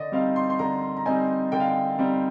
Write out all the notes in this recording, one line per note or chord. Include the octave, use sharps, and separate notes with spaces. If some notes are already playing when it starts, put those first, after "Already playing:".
Already playing: D3 D5 D#5
G3 C4 D#4 F5
C6
C6
D3 A#5
A#5
G3 C4 D#4 G#5
D3 G5
F5
G5
G3 C4 D#4